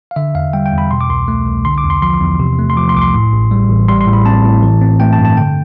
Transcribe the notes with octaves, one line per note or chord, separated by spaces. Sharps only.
F5
D3 E5
E2 F5
G3 G5
G5
E2
B5
B2 C6
D6
C2 C6
A3
C2
D3 C6
D6
E2
C6
F3 C6
E2
C3
A3
C6
F3 D6
C6
C2 D6
C6
A2
A1
G3
A1
G3 C6
C6
A2
B5
C4 A5
A2
E3
C4
A3 G5
A5
G2
A5
D3 G5